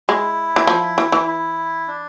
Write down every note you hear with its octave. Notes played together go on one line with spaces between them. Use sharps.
G#3 E4
E3
F3
E3
E3
E4
D4